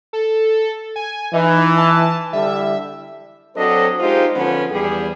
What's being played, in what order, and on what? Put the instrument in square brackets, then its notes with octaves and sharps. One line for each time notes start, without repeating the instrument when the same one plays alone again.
[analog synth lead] A4
G#5
[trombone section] E3 [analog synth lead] D#4
[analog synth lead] A5
[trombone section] D3 G3 E4 [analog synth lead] E5
[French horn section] F#3 C4 D4 A4 C5 D#5
G#3 D#4 F4 G4 C5
D3 F3 B3 C#4 B4
E2 G3 G#4